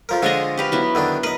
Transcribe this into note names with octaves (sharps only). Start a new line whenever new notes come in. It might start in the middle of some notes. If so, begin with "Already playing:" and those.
F2 F3 A#4
D3 F3 G#3 D4 C#5 D#5
G4 B4 F5
F#3 B3 E4
D3 D#3 D4
A#4 B4 D#5